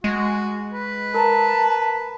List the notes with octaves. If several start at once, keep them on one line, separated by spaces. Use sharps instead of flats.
G#3 F#4
B4
A#4 A5 A#5